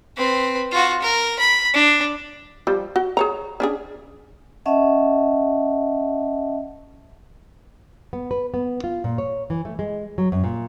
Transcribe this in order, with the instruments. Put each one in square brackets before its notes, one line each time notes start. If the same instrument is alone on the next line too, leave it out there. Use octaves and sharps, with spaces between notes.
[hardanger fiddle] C4 B4
F4 F#4
A#4
B5
D4
[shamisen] F3 G3
F#4
G#4 C#5 A#5
C#4 D4 G#4
[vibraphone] C#4 D#5 E5 F#5 A5
[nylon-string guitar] B3
B4
B3
F4
A#2
C#5
E3
A3
G#3
F#3
F#2
A#2